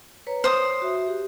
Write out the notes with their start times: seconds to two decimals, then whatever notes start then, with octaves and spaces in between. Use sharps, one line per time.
0.27 B4 C#5 A#5
0.44 C5 C#5 D#6
0.82 F#4 E5
1.07 G4